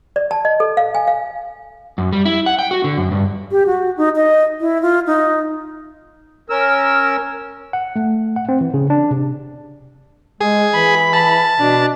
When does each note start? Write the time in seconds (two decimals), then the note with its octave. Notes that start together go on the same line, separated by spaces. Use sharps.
0.16 D5
0.31 A5
0.45 D#5
0.60 A4
0.77 F5
0.95 G#5
1.07 F5
1.98 F#2
2.13 G3
2.25 E4
2.46 F#5
2.59 G5
2.71 F#4
2.84 D3
2.97 F#2
3.12 G2
3.51 G4
3.67 F#4
3.97 D#4
4.16 D#5
4.61 E4
4.82 F4
5.07 D#4
6.50 C#4 A#4 E6
7.73 F#5
7.96 A3
8.36 F#5
8.49 C4
8.61 E3
8.74 C#3
8.90 D4
9.11 C3
10.41 G#3 G#4
10.75 E3 B5
11.13 A5
11.60 B2 D4